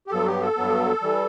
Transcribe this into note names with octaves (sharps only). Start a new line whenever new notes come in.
G4
G2 F#3 B3 A4
G4
A4
G2 F#3 B3
E3 G3